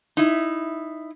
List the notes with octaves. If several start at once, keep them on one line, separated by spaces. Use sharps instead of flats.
D#4 E4